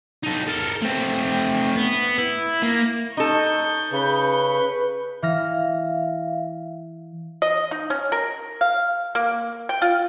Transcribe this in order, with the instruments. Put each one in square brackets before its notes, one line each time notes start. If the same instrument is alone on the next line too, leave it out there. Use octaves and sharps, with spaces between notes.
[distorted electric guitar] D#4 A4
A4 A#4
A3 C4
B3
E4
A#3
[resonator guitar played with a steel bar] D#4 A4 [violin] C#6 G6
[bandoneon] C#3 [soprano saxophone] B4
[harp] E3 F6 A#6 [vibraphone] E5 F5
[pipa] D#5
D#4
C#4
A#4
F5
A#3
G5
F4